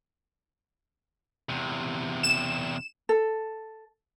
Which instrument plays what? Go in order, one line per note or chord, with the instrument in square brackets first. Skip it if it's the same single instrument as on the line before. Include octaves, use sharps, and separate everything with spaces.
[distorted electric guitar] E2 C3
[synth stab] E7
[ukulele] A4